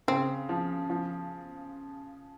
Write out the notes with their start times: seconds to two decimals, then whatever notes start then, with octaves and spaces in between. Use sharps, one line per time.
0.08 C#3 C4
0.49 F3
0.90 F3